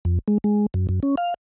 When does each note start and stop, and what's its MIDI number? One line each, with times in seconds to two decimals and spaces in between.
0.05 0.19 41
0.28 0.38 56
0.44 0.66 56
0.74 0.87 42
0.89 1.00 42
1.03 1.15 61
1.17 1.34 77